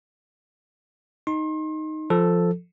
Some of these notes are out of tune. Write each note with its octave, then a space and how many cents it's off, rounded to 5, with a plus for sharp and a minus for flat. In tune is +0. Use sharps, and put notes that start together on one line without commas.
D#4 +0 C6 +35
F3 +0 A4 +0